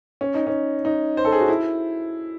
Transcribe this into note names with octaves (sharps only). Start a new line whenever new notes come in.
C#4
D#4
C#4
D#4
C5
A4
G#4
F#4
E4